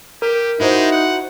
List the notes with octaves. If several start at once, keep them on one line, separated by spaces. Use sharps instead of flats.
G4 A#4
G#3 D#4 E4 F#4 C5
F#5